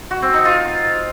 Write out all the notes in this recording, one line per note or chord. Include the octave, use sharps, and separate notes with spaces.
F#4
C4
D#4
F4